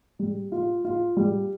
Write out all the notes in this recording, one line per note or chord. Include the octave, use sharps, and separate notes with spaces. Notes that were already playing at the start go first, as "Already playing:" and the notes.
G3
F4
F4
G3